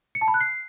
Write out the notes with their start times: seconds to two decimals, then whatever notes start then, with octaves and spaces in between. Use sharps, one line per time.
0.15 C#7
0.21 A5
0.28 B5
0.34 F#6
0.40 C7